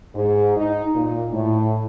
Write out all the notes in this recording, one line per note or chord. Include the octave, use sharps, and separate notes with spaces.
G#2
D#4
A#2
A2